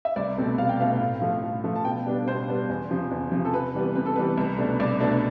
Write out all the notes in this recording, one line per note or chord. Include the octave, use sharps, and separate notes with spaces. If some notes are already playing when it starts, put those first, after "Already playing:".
E5
C2 D5
B2 A3 C4
C2 F5
G5
B2 A3 C4 F5
A2
F3 A3
A2
F3 A3
A5
B2 G5
G3 B3 D4
B2 C5
G3 B3 D4
E2
C3 F3
E2
C3 F3
A4
C3 B4
E3 G3 B3
C3 B4
A4
E3 G3 B3 B4
C2
B2 A3 D4
C2 D5
B2 A3 D4